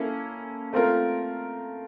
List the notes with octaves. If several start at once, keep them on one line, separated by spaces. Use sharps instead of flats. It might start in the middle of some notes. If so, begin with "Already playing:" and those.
Already playing: A#3 C#4 E4 A4
A3 C4 F4 A#4